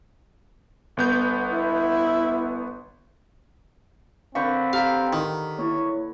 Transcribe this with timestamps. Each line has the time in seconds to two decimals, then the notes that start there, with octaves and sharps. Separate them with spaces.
0.97 G1 B3 G6
1.50 E4
4.35 D3 C4 B4 F5 C#6 G6
4.73 G4 F5 A#5 B6
5.13 D#3
5.59 A#3 E4 C#5